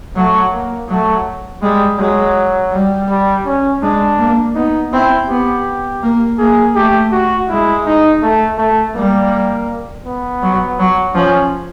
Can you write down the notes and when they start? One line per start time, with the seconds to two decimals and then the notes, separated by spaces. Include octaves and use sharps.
0.16 F#3 A3
0.53 A#3
0.89 F#3 A3
1.62 G3 G#3
1.99 F#3 G#3
2.72 G3
3.10 G3
3.46 C#4
3.82 G#3 D4
4.18 A#3
4.55 B3 D#4
4.93 C4 E4
5.29 B3 G4
6.03 A#3
6.38 A#3 G#4
6.75 A3 G4
7.12 F#4
7.49 G#3 E4
7.86 D#4
8.22 A3
8.58 A3
8.96 G3 A#3
10.05 B3
10.42 F#3
10.79 F#3
11.15 F3 C#4